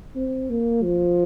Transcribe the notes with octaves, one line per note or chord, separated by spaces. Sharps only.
C4
A#3
F3